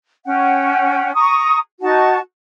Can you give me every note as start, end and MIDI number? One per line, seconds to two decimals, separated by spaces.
0.25 1.12 61
0.25 1.12 78
0.25 1.12 79
1.14 1.58 82
1.14 1.58 85
1.14 1.58 87
1.81 2.18 63
1.81 2.18 66
1.81 2.18 81